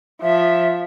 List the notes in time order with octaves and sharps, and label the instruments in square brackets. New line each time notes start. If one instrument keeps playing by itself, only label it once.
[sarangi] F3 [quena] E5